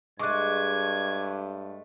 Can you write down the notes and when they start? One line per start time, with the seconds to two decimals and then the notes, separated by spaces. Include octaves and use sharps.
0.19 G2 G#3 A3 C#6 D6 F#6 G#6